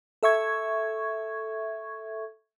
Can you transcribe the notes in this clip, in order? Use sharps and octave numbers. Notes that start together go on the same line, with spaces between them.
A4 E5 C#6 G#6